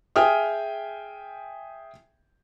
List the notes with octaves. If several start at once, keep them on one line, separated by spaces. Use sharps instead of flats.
G#4 E5 G5 G#5 D#6 F6